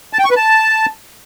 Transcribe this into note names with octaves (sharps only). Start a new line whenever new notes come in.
A5
G5
C#6
B4
A5